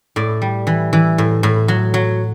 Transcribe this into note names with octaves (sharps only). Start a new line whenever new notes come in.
A2 D5
G3
E3
E3
A2
A2
F#3
F#3